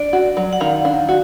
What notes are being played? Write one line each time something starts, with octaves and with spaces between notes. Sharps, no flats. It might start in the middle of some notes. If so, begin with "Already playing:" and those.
Already playing: D4 D5
F#4
F#3
F#5
D#3 F5
D4
F#4